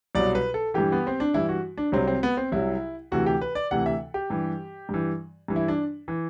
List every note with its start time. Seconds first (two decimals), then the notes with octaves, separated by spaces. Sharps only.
0.15 C2 B2 F#3 D5
0.35 B4
0.54 A4
0.74 G2 E3 G4
0.92 B3
1.07 C4
1.20 D4
1.34 G2 E3 E4
1.49 F#4
1.77 D4
1.92 C2 C3 F#3 C4
2.07 C4
2.23 B3
2.37 C4
2.52 C2 C3 F#3 E4
3.12 D2 C3 E3 F#4
3.26 G4
3.41 B4
3.55 D5
3.71 D2 C3 E3 F#5
3.86 E5
4.14 G4
4.30 G2 E3
4.89 G2 E3
5.48 G2 E3
5.56 E4
5.68 D4
6.08 E3